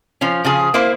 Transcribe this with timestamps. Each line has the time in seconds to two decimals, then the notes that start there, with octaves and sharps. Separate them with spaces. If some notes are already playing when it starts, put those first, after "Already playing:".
0.21 F3 C#4
0.44 C#3 F3 G#4
0.74 A#3 E4 C5